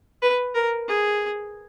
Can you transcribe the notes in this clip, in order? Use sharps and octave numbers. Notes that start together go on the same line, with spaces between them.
B4
A#4
G#4